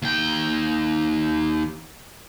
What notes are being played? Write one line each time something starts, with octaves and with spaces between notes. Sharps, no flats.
D#2 G5